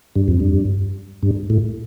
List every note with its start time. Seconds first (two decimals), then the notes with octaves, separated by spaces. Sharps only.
0.16 G2
0.28 F2
0.40 G2
1.23 G2
1.50 A2